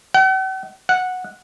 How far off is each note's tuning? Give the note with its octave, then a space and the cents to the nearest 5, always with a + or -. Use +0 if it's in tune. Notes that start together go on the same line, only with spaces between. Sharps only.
F#5 +45
F#5 -10